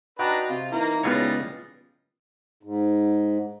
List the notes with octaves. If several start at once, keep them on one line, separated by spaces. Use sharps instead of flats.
D4 D#4 F#4 B4 D#5 G5
C3 F4
E3 A#3 D#4 E4 A#4
C#2 G3 G#3 B3 F4 C#5
G#2